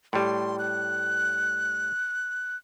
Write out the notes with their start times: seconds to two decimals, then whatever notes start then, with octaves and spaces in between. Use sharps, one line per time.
0.13 A2 G3 C6
0.59 F#6